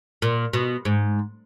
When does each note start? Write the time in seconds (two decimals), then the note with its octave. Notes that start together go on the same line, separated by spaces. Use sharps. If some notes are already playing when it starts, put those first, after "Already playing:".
0.22 A#2
0.53 B2
0.85 G#2